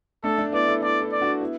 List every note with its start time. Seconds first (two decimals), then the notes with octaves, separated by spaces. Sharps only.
0.23 A3 D4 A4
0.38 A3 D4
0.53 B3 E4 D5
0.68 E4 A4
0.82 E4 A4 D5
1.02 E4 A4
1.12 D5
1.22 D4 F#4
1.41 B3 E4